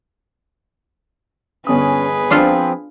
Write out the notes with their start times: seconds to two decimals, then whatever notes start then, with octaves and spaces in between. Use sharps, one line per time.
1.67 G1 C#4 G#4 B4 D#6
2.31 F3 C4 D4 F4 A4